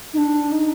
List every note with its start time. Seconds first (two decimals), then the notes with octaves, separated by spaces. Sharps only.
0.14 D#4
0.18 D4
0.52 D#4